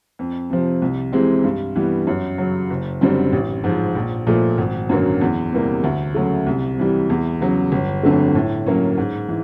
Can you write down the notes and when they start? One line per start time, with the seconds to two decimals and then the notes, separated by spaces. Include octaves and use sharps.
0.19 F2
0.50 C3 F3
0.82 C2
1.12 C3 E3 G#3 C4
1.44 G2
1.76 E3 G3 B3
2.07 F#2
2.38 C#3 F#3
2.70 F#1
3.01 F#2 D3 G3 C4
3.33 A1
3.64 G#2 F3
3.95 A#1
4.27 A#2 F3 A3
4.58 G#1
4.89 F#2 D3 F#3 A#3
5.21 E2
5.52 C3 E3 G3 A#3
5.84 D2
6.15 C#3 F#3 A3
6.46 C2
6.78 C3 E3 G3
7.10 E2
7.41 C#3 F#3
7.72 G1
8.03 F2 D3 F#3 A3
8.35 A2
8.66 F#3 A#3 C#4
8.97 G#2
9.28 E3